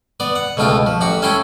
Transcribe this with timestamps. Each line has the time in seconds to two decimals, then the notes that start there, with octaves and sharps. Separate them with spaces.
0.20 B3 D5
0.36 F#5
0.57 C#2 B2 A3 F4 G5
0.86 F3
1.01 A1 F#4 G4 C#6
1.22 C#4 E4 A4 G5 C6